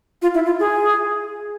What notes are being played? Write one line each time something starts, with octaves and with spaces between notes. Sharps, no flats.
F4
E4
F4
G#4